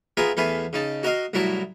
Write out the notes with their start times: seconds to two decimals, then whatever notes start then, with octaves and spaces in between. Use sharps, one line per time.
0.17 B3 F4 G#4 A#4 E5 A#5
0.37 E2 A3 B3 B4 F5 G#5
0.73 C#3 D#4 A5
1.03 F#4 A#4 D#5 F5
1.33 C2 A2 F#3 E4 A#4 A5